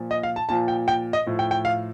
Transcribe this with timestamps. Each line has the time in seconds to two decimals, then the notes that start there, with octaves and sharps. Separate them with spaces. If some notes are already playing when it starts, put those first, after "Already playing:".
Already playing: A#2 F3
0.11 D#5
0.23 F5
0.36 A5
0.49 A#2 F3 A5
0.68 G5
0.88 G5
1.13 D#5
1.26 A2 F3
1.39 G5
1.51 G5
1.65 F5